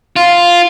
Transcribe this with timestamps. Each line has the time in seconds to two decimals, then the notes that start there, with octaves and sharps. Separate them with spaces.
0.16 F4